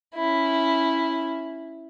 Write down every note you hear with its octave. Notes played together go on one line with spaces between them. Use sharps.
C#4 E4